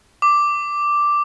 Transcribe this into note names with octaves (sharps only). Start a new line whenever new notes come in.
D6